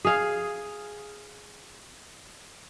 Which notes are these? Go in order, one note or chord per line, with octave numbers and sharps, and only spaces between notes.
G#4 F5